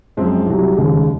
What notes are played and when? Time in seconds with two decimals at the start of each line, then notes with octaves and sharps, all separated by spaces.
0.17 F#2 F3 G#3 C4
0.46 C2 C3 F#3
0.77 F1 D#2 C#3 G#3